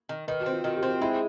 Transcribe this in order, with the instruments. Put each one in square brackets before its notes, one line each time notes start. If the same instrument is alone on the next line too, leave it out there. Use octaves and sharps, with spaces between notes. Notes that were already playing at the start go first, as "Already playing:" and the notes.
[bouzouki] D#3
[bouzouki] D#3 [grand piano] B4
[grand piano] F#4
[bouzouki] C4
[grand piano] F4
[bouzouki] D#3 [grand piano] F#4
[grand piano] G4
[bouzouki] C4
[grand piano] F4
[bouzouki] G#3 [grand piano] E4